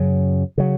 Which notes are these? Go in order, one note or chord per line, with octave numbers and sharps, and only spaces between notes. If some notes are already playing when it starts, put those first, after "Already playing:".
Already playing: F#2 C#3 F#3
C#3 F#3